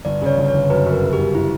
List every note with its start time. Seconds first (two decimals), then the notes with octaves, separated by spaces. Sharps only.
0.05 G1 D5
0.21 C#3 C#5
0.38 G1
0.48 C#5
0.54 G1
0.70 F#2 B4
0.86 F#2
0.92 A#4
1.02 C#3
1.13 G4
1.18 G1
1.35 E4